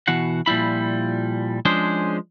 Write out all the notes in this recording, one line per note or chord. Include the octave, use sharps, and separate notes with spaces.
B2 E3 F#4 F#5
A#2 F3 G3 E4 B5
F3 G#3 C#4 D4 G#4 C5